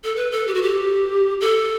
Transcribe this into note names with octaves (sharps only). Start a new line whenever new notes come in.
A4
B4
A4
G4
F#4
G4
A4